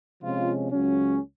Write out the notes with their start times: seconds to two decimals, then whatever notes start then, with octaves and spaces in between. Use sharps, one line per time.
0.22 C3 F3 G#3 C#4 F4
0.71 C#2 C#3 F#3 C#4